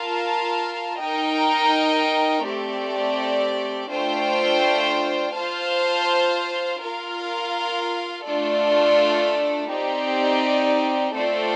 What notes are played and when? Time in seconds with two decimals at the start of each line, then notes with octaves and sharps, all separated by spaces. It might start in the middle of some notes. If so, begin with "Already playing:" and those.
Already playing: F4 A#4 F5 A5
1.01 D#4 A#4 D#5 G5
2.46 A3 C4 G4 D5
3.90 A3 D4 F4 C5 G5
5.35 F4 C5 F5 A5
6.80 F4 A#4 F5
8.26 A3 D4 F4 A4 D5
9.70 C4 D#4 G4 D5
11.14 A3 C4 F4 A4 D5